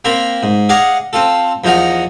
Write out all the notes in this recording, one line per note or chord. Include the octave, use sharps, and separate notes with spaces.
A#3 C4 A#4 B5
G#2
G#4 D5 D#5 F5 F#5
C4 F4 A4
E2 F3 D#4 A#4 F#5